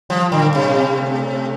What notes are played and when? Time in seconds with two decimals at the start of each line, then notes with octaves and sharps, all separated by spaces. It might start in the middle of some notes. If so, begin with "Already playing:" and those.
0.09 F3 G3
0.32 A#2 D3
0.55 C3 D4
0.77 C4
0.99 A3
1.22 A3